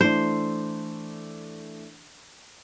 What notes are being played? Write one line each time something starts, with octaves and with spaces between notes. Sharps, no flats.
E3 A3 D4 C5